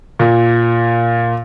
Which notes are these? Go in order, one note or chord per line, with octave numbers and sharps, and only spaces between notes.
A#2